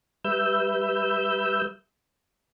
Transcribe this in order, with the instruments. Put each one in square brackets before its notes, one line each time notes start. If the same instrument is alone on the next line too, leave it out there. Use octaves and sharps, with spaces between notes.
[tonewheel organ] G3 B4 E5 E6 G6